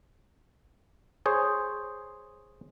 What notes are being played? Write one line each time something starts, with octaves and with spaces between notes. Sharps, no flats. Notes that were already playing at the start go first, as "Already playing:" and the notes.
G#4 C5 C#5